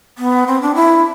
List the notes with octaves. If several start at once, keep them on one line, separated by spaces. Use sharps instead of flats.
B3
C4
D4
E4